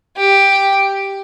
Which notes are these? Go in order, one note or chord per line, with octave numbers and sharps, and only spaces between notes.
G4